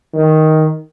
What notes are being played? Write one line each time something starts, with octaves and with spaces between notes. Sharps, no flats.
D#3